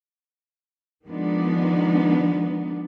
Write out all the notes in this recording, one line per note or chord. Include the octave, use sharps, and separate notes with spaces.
D#3 F3 G#3 B3 D4 D#4